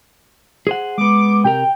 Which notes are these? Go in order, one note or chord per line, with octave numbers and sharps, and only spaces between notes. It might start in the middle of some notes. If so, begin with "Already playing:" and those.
G#4 C5 F#5
G#3 B3 D6
C3 G4 A#4 G5